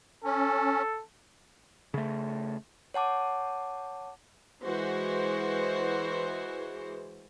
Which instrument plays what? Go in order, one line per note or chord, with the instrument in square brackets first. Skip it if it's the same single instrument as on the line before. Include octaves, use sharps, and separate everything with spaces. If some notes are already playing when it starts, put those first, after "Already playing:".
[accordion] C#4 [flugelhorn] A4
[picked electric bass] C#3 A3
[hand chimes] C#5 F#5 A5 D6
[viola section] E3 G#3 F#4 C5